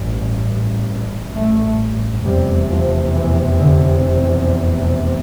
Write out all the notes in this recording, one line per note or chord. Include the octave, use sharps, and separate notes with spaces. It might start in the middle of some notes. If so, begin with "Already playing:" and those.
Already playing: A1 G2
A3
F1 E2 C3 G3
F3
E3
D3